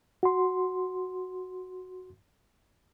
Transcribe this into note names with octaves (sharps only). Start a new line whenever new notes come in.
F#4 C6